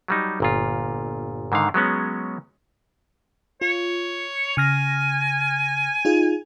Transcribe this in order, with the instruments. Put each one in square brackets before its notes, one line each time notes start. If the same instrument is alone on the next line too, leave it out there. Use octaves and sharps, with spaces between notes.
[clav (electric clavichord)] F#3 G3 D#4
G1 A#2 F4
G#2 D3 D#3 F5
F#3 G#3 B3 C#4
[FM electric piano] F4 [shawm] C#5
[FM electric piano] C#3 F6 A#6 [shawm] G#5
[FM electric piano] D#4 F4 G#4